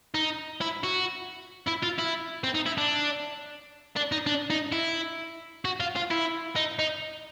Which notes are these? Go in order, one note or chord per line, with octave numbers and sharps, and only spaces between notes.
D#4
E4
F#4
E4
F4
E4
C4
D#4
E4
D4
D4
D#4
D4
D#4
E4
F#4
F4
F4
E4
D#4
D#4